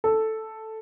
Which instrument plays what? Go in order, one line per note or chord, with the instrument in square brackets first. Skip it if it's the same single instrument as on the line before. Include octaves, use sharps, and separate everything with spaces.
[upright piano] A4